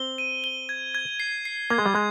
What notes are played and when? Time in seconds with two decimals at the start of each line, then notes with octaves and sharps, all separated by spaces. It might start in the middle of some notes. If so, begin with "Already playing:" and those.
Already playing: C4 G7
0.18 D#7
0.44 G7
0.69 G#6
0.95 G#6
1.20 C7
1.45 C7
1.70 A#3 G#6
1.78 G#3
1.86 G3
1.95 G#3 G#6